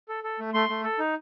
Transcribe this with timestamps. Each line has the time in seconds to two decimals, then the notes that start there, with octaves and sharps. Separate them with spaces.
0.09 A4
0.24 A4
0.39 A3
0.54 A3 C6
0.69 A3
0.84 A4
0.99 D#4